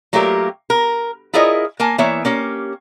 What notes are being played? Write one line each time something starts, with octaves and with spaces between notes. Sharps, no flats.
F#3 A3 A#3 F4 G4 A#4
A#4
E4 F4 G#4 A#4 C#5 D#5
A#3 A#4 G#5 A5
E3 A#3 B3 E4 C#5 E5
A#3 C#4 G4